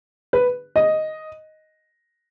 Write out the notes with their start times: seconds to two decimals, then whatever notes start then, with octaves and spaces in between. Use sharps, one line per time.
0.33 B4
0.76 D#5